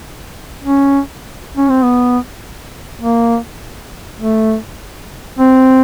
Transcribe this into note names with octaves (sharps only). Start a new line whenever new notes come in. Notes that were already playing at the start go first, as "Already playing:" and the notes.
C#4
C#4
C4
B3
A#3
A3
C4